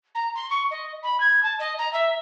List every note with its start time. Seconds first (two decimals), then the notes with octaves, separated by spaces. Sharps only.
0.15 A#5
0.35 C6
0.51 C#6
0.71 D#5
1.03 B5
1.20 G#6
1.43 A5
1.59 D#5
1.79 A#5
1.93 E5